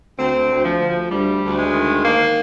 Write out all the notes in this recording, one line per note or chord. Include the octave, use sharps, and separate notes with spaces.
D2 C4
D2
F3
D2
D2 G3
D2
G#3
D#3
D#3 A#3